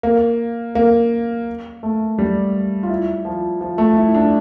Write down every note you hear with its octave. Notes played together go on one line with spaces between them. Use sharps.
A#3
A#3
A3
G3
F4
E4
F3
F3
A3
E4
D4